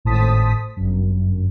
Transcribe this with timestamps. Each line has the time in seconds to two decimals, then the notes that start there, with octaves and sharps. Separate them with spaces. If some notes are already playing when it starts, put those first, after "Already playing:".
0.05 G#1 A2 C5 A5 D#6 B6
0.77 G1 F#2